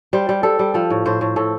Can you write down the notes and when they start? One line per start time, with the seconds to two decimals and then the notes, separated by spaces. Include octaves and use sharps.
0.13 G3 C5
0.29 G3
0.43 G3 A4
0.59 G3
0.74 F3 A4
0.90 A2
1.06 A2 C5
1.21 A2
1.36 A2 A4